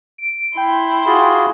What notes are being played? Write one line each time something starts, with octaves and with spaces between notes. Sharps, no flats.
D7
E4 G5 C6
F4 F#4 G#4